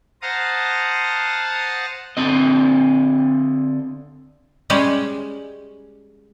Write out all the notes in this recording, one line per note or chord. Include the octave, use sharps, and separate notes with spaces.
C5 F5 F#5 A5 A#5 D#6
D3 C4 D#5
G3 G#3 C#4 G#4